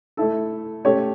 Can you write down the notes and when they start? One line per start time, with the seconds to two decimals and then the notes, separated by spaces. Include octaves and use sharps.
0.17 A3 E4 A4
0.85 A3 C#4 G4 C#5